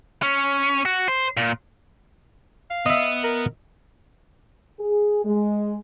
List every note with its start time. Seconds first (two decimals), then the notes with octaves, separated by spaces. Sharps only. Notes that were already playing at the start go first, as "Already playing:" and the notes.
0.22 C#4
0.85 F#4
1.08 C5
1.37 A#2
2.70 F5
2.86 B3 D#5 E5
3.23 A#4
4.80 G#4
5.24 G#3